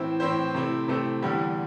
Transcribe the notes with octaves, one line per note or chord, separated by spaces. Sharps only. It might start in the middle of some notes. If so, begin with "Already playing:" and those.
Already playing: A2 E3 C4 E4 C5
A2 E3 C4 E4 C5
C3 A3 C4 E4
C3 A3 C4 E4
E2 D3 G3 E4 G4